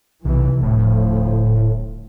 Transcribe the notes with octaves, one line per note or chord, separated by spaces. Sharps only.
B1 C3 E3
D#1 D2 A2 F3